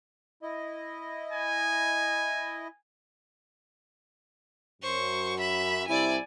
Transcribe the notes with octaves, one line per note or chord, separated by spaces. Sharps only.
E4 D#5
G#5
F#2 C5 C#6
E5 B5
C2 C3 E4 D5 G#5